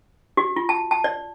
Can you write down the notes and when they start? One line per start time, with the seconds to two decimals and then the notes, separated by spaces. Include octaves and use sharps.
0.37 F#4
0.56 F4
0.69 A5
0.91 A5
1.04 D5